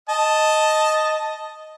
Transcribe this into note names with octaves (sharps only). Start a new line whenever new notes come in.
D#5 A5